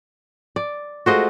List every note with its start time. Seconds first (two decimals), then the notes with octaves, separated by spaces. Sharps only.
0.56 D5
1.06 G#3 A3 F4 F#4 C5 D#5